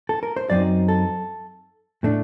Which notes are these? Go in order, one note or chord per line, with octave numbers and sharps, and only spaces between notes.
A4
A#4
C5
F#2 F#3 C4 D#4 D5
A4
A2 A3 D4